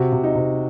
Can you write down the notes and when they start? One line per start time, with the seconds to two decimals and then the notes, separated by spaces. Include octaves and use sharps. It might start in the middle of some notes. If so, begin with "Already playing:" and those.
Already playing: C3 F#4
0.12 C3
0.24 D#4
0.35 C3